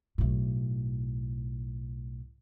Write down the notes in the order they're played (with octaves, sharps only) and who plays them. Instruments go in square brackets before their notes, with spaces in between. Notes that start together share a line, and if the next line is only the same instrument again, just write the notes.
[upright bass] B1 A2